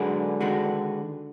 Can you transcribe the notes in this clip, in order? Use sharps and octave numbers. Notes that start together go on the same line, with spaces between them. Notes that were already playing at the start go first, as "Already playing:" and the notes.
Already playing: G#2 D3 F#3 D4 G#4 B4
D#3 G#3 D4 F#4 B4